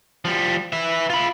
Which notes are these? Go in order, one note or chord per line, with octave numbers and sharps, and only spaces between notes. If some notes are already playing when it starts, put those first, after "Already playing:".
F3 G3
B4 E5
F4 B5